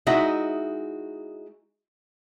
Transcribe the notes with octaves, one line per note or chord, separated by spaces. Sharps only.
G#3 D#4 E4 F#4 D#5 E5